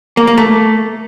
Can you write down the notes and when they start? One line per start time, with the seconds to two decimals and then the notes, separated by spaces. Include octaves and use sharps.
0.17 A#3
0.27 A#3
0.38 A3